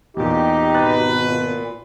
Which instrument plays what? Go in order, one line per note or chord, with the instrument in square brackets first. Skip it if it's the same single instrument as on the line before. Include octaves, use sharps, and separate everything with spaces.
[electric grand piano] E2 A#2 [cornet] D#4 [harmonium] G4
[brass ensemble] G#1 B2 B4 [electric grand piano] A5 F#6 A6
[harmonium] A#2